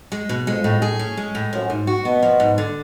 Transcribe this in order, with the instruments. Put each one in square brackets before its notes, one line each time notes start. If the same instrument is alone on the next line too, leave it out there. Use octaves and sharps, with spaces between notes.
[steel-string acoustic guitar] G#3
B2
[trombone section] F2 [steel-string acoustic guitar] G#3
[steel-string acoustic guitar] A2
G#4
C#4
G#3
A2
[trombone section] F#2 [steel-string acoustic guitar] F3
[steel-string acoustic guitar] G#2
F#4
[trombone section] B2 [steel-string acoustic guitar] B3
[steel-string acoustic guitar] F3
G#2
D3